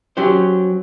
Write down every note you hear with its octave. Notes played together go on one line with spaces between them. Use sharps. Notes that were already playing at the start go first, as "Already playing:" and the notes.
F#3 C#4 G4 C5